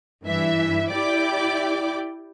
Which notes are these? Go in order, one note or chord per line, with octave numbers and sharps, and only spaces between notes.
G2 E3 E5
E4 G4 D5 G5 D6